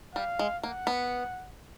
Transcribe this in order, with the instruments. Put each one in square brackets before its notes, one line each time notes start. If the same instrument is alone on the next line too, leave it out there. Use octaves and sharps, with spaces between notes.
[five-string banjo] G3 [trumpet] F5
[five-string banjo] G#3
[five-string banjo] A#3 [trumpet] F#5
[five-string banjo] B3